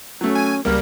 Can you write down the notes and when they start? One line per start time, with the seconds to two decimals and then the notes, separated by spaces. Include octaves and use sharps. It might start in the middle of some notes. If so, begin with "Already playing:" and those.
0.21 F#3 A3 C#4
0.35 G#5
0.65 C#2 G3 A#3 A#4